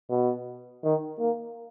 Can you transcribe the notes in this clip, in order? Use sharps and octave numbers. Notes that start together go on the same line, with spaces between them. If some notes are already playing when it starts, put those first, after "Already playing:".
B2
D#3
A#3